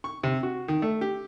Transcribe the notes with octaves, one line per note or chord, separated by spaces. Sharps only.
C#6
C3
F#4
D#3
A3
G4